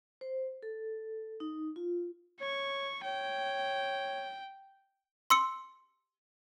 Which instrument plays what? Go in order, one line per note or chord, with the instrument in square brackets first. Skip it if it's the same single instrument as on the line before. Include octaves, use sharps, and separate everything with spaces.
[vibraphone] C5
A4
D#4
F4
[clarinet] C#5 [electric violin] C#6
[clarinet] C#5 [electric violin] G5
[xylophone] C6 E6 C#7